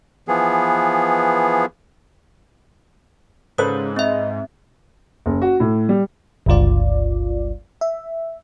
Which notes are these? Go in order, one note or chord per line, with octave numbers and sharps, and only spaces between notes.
E3 F3 B3 G#4
G#2 C#3 A4 B4 C5 D#6
C4 D#5 E5
F#1
F#4
A2
G3
G1 C#2 G2 F4 D5
E5